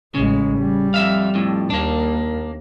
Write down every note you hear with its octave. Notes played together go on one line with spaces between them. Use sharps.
A1 C#3 G#3
G3
F2 E5 F5
F2 A2
D#2 A#3 D4